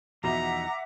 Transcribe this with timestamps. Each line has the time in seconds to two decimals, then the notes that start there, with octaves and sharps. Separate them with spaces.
0.24 E2 B2 F3 D#4 E5 F#5 A#5 D6